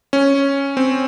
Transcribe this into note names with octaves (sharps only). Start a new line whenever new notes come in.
C#4
C4